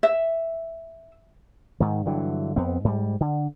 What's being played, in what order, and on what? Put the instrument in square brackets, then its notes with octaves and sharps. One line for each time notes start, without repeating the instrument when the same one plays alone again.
[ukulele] E5
[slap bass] G#2 D#3
G2 D3 E3 F#3
F2 B3 C4
G#2 G3
D3